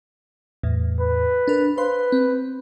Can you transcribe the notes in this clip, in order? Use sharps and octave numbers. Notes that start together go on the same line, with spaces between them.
E2 A2
B4
D4 A#4
B4 C5 F5 C6
C4